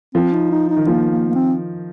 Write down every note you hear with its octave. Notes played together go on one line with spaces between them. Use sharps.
F3 C4
D#4
D#4
D#4
D#3
F3 A#3
A#3
A#3
C4